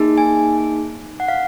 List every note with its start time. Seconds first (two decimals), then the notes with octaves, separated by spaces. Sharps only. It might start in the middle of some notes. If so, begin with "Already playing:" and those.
Already playing: A#3 D#4 G#4
0.18 G#5
1.20 F#5
1.28 F5